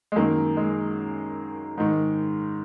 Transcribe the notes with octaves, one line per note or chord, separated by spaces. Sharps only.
G#3
F#2 D#3 A#3
G#3
G#2 D#3